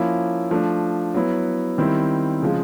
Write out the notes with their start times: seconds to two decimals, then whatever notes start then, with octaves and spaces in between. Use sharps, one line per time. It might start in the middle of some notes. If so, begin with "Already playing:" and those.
Already playing: F3 A#3 C#4 E4
0.51 F3 A3 D4
1.15 F#3 B3 E4
1.78 D#3 G3 C4 E4
2.42 C#3 F3 G#3